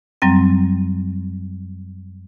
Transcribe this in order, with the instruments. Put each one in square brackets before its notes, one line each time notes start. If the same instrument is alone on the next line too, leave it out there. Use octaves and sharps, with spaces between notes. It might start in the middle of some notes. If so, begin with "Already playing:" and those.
[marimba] F#2 F#3 G3 C4 G5